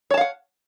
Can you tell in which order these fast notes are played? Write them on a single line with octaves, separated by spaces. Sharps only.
C#5 A5 F5 F#5